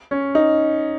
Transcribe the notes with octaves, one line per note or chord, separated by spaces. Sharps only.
C#4
D#4